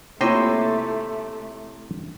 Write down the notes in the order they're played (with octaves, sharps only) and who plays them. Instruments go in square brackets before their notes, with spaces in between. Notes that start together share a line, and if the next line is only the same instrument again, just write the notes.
[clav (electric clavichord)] C3 C5 D#5 [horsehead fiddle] A3 [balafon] A#3 F4 [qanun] E4 C#5